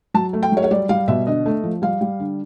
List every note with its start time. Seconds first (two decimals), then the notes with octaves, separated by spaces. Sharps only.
0.14 F#3 A5
0.33 A3
0.43 G5
0.52 F#3 C#5
0.64 C#5
0.71 G3 D5
0.89 G3 F5
1.08 B2 E5
1.27 D3 D#5
1.46 A3
1.64 F3
1.82 G3 F5
2.01 G3
2.20 D3